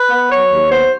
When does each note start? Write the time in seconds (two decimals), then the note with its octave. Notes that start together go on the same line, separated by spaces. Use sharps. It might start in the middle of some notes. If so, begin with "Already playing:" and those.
Already playing: B4
0.10 B3
0.29 F#3 C#5
0.49 D#2
0.70 B3 C5